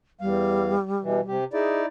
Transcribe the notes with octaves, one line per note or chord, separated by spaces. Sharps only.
E2 G3 F5
B2 E3
C3 G4
D#4 E4 G#4 D5